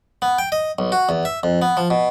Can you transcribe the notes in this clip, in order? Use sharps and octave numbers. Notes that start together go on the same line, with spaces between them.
B3
G5
D#5
B1
F#4
E2
E5
F2
B3
F3
B2